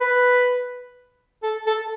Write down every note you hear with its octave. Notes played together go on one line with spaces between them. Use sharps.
B4
A4
A4